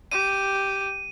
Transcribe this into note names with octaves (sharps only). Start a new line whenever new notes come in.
G4 D#7